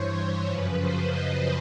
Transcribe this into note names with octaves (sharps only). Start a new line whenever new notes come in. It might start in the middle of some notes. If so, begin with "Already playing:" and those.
Already playing: G2 E3 C5 C#5
C5
F#2 C#3 F3 B4
C5
D#5